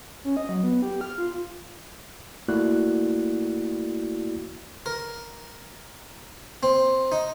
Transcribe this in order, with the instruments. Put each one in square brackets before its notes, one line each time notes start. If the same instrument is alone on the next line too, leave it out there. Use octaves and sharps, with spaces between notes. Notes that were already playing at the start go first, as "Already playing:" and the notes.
[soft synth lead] C#4
D#5
F#3
B3
G4
F6
F4
[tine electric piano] A3 A#3 E4 F#4 D5 F#6
[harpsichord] A#4
C4
D#4